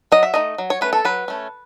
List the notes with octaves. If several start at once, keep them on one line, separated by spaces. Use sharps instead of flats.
F#3 D#5
E5
A3 D#4 D#5
F#3
C#5
A3 C#4 B4
A4
F#3 B4
A3 C#4